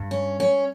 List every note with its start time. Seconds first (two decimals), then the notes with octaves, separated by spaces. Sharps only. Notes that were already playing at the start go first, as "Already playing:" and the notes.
Already playing: G2
0.11 C#4
0.40 C#4